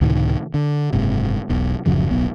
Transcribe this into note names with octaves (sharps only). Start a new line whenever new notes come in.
C#2 A2 C3 D#3
D3
F#1 G#2 C3
E1 B1 B2
D1 F#2 C#3 F3
D1 B1 B3